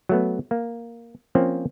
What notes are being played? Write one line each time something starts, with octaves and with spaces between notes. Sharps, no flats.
F#3 A3 B3
A#3
F3 A#3 C4 C#4